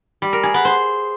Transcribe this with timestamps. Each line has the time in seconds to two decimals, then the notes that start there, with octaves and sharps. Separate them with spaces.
0.22 G3
0.33 A#4
0.43 G#4
0.54 B3
0.65 C5